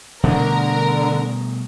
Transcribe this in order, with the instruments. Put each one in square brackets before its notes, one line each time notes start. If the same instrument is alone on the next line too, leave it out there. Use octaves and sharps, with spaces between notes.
[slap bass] B2 G3 A3 [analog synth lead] D3 [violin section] A#4